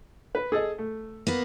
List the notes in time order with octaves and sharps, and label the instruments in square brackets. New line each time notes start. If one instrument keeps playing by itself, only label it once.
[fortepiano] B4
G#4 A4 D#5
A3
[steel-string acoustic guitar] A#3 B3 B4